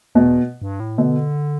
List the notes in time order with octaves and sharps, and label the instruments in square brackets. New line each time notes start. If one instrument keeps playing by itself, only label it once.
[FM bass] E2 [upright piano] B2
[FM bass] G2
A2
[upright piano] B2 [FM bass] D3